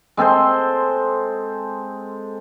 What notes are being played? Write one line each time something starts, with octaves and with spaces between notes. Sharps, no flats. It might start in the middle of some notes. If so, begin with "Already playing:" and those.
G#3 C4 A4 C5